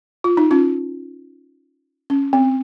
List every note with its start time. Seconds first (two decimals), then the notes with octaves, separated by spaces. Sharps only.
0.24 F4
0.37 D#4
0.51 C#4 F4
2.10 C#4
2.33 C4